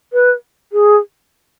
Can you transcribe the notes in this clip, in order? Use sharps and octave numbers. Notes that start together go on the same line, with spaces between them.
B4
G#4